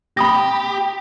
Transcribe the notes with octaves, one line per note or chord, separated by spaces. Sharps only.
G4 B5 D#6 A#6